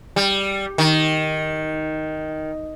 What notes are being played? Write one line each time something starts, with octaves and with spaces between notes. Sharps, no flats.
G3
D#3